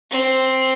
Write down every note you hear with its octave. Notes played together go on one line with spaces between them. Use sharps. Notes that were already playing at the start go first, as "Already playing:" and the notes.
C4